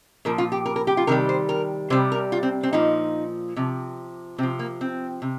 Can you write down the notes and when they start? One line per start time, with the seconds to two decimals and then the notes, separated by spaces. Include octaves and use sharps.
0.25 A#2 F3 A#4
0.38 F4
0.52 G4
0.66 A#4
0.76 A#4
0.87 G4
0.97 F4
1.07 C3 D#3 G3 A#4
1.29 C5
1.49 A#4
1.90 C3 G3 C5
2.12 A#4
2.32 F4
2.43 C4
2.63 C4
2.73 A#2 F3 D#4
3.56 C3 F3
4.38 C3 C4
4.43 F3
4.59 A#3
4.81 C4
5.22 C3